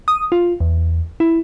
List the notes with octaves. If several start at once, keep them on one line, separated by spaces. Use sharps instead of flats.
D#6
F4
E2
E4